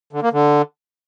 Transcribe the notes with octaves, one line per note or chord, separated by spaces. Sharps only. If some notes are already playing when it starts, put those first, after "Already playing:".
D3
A#3
D3